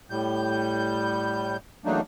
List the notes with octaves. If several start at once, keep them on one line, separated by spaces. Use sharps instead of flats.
A2 G3 G6
E2 F#3 A3 A#3 D4 D#4